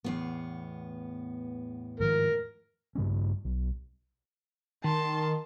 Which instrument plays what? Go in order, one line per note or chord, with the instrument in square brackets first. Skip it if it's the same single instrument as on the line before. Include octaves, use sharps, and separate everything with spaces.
[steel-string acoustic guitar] E2 A2 B3
[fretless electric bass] G#2 D#3 F3 [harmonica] A#4
[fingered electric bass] G2 C#3 A3 C#4
B1
[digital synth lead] D#3 [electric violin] A5 C6